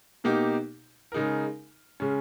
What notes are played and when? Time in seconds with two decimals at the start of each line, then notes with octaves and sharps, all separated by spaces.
0.24 B2 A#3 D#4 G4
1.12 C#3 G#3 D#4 A#4
2.00 C#3 G#3 C#4